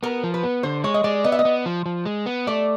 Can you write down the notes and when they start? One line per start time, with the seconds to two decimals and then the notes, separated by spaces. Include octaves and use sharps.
0.03 B3 A#4
0.24 F3
0.34 B4
0.43 B3
0.63 D3 C5
0.84 G#3 C#5
0.94 D#5
1.04 G#3 D5
1.24 B3 D#5
1.32 E5
1.39 D#5
1.45 B3
1.66 F3
1.86 F3
2.06 G#3
2.26 B3
2.47 A3 D5